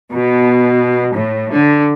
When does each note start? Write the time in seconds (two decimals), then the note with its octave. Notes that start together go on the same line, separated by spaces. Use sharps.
0.12 B2
1.16 A2
1.50 D3